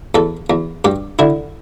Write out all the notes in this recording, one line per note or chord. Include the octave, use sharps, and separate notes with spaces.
E2 A4
E2
G2 G4
D3 E4